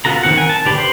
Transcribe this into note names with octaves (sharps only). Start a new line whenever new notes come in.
B3 F4 F#4 A4 A#5
D#3 C4 F#5
A#4 G#5
A5
D3 G4 B4
C5 B5 C6